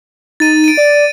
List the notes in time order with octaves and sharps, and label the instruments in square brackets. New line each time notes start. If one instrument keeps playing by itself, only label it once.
[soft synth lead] D#4 [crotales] A6 D#7
[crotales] D7 D#7
[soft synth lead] D5